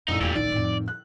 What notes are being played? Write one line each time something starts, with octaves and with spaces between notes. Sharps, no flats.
A#1 F#2 A2 D#4 E6
E2 A#2 G3 D#4
A1 D2 D#3 D5
F2 A2
F#6